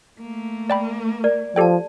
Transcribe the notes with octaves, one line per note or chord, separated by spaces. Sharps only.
A3 A#3
D5 G5 B5
A#4 D5
F3 G4 A4 D5 G5 A5